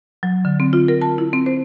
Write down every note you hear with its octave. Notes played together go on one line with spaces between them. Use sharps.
F#3
D3
C4
F4
A#4
A5
E4
C4
C5